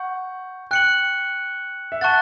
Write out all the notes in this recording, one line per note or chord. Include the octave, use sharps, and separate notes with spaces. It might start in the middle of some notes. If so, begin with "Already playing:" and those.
Already playing: F#5 C#6 G6
G5 F#6 C#7 F#7
E5
F#5 A5 C#6 F#6 A6